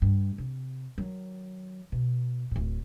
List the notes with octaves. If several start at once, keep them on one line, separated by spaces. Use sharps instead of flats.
G2
C3
D#3 F#3
B2
D1 A2